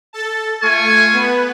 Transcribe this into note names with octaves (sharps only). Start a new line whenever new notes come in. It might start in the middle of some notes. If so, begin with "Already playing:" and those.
A4 A5
A3 F4 G#5 C#6
B3 B4